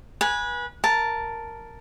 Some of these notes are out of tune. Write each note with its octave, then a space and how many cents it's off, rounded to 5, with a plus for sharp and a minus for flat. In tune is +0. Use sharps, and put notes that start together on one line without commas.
B4 -30 G#5 +0
A#4 +0 A5 +0